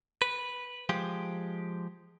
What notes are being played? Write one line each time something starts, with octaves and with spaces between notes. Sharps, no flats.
B4
F3 G#3 G4